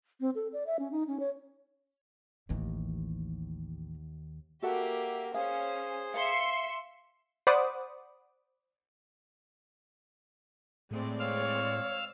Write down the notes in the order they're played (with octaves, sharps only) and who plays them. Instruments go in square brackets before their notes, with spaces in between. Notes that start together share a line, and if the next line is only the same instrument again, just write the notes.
[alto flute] C4
A4
D5
E5
C#4
D#4
C#4
C#5
[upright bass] A1 E3 [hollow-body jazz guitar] D#2
[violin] A#3 G4 [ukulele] F#4 A4 F#5 [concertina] E5
[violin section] C#4 [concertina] G#4 [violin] C5 [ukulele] F5
[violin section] E5 C6 C#7 [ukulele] F5
[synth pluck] C5 D5 F#5 B5 D6 D#6
[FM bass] A2 [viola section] G#3 C4 D5
[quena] C#5 [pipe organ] F5 E6 F6